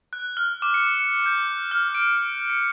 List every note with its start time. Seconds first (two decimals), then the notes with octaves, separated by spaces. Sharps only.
0.13 F#6
0.37 F6
0.62 D6
0.74 C#7
1.00 C#7
1.26 G6
1.71 F6
1.95 D7
2.50 C#7